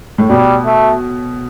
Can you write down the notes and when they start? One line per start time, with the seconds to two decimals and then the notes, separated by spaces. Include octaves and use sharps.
0.18 A2
0.30 B2 G3
0.66 A3